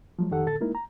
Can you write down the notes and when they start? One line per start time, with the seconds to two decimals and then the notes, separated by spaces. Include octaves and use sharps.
0.19 F3 F#3 G#3
0.31 F2 D#3 G4 A4 F#5
0.46 A2 D3 A4 A6
0.61 G#3 A#3 D#4 E4 A#4
0.75 A#5